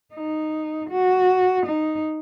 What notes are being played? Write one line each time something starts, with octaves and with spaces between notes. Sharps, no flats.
D#4
F#4
D#4